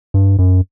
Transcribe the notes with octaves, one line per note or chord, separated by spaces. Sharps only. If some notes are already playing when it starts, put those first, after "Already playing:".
G2
F#2